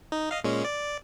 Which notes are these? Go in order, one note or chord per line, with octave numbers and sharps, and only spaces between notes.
D#4
D#5 F5
A#2 G#3 C#4
D5